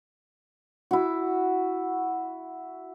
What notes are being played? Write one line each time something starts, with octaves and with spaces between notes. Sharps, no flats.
E4 F#4